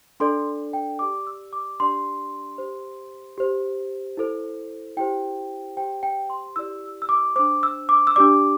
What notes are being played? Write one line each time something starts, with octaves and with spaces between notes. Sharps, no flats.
D4 A4 D5 C6
G5
G4 D5 D6
E6
D6
D4 G4 D5 C6
G4 C5
G4 C5
E4 A4 C5
E4 G4 C5 G5
G4 C5 G5
G5
C6
E4 G4 D5 E6
E6
D6
D4 C5 D6
E6
D6
E6
D4 G4 D5 D6